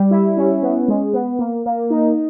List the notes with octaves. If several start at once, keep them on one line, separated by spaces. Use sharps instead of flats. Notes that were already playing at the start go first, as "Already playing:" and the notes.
Already playing: G3
E4
C#4
B3
G#3
B3
A#3
A#3
D#4